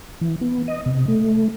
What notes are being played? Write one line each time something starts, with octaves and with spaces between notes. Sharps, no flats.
E3
B3
D#5
C3
A3